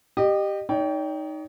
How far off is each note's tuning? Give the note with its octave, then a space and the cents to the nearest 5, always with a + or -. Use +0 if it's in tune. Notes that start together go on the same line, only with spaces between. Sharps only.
G4 +0 D#5 -30
D#4 +0 C#5 +45 G5 +0